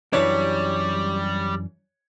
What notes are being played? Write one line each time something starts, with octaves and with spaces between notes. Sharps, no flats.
F#2 E3 G3 D4 C#5